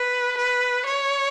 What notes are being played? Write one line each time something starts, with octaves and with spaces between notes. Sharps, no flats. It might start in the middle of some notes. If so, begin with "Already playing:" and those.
Already playing: B4
B4
C#5